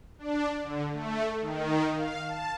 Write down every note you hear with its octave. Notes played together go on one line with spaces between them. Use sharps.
D4
D3
A3
D#3
F5
A5